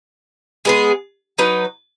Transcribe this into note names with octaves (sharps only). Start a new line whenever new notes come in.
G#3 B3 G#4
F#3 D#4 B4